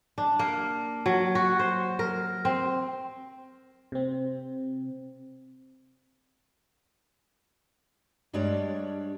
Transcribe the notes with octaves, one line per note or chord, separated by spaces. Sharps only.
D4
A#3
F#3
F#4
C5
A#4
C4
C3 C4
G2 G3 G#3 D4 C#5 D5